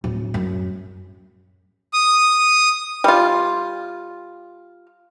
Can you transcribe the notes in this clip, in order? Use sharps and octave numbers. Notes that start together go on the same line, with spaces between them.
D1
F#2
D#6
G3 F4